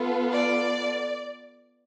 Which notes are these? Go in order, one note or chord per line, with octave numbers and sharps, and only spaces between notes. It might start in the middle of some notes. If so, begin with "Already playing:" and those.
Already playing: B3 F4 A4
D5